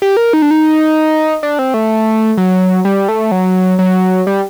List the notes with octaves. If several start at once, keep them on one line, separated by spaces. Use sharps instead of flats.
G4
A#4
D#4
D4
D#4
D4
C4
A3
F#3
G3
A3
F#3
F#3
G3